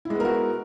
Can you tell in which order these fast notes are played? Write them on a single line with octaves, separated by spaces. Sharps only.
E4 G#3 B3 A#4 F#4